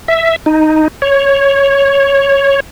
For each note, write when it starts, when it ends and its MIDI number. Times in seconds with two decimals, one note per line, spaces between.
0.08 0.36 76
0.46 0.88 63
1.02 2.60 73